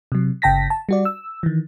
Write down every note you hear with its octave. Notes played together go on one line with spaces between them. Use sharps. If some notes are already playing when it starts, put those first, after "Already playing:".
C3 F#3
G1 C#3 G5 A5 A#6 B6
A5
G3 F#4 D5
E6
D#3 E3